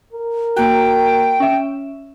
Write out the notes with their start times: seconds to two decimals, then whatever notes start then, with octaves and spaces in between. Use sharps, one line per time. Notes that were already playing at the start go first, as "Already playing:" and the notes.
0.13 A#4
0.56 A#3 F#4 G5
1.40 C#4 E5